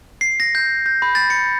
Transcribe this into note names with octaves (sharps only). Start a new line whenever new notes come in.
C7
A#6
G6
G6
B5
A6
C#7